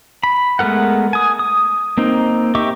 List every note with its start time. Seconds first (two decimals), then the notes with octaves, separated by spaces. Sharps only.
0.24 B5
0.59 G#3 A3 B3 A#4 F#5
1.13 G#5 D#6
1.39 D#6
1.98 A#3 C4 D#4
2.55 G4 D#5 E5 C#6 D6